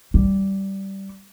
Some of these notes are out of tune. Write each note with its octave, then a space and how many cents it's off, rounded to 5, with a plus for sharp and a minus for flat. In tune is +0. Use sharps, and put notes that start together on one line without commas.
G3 -15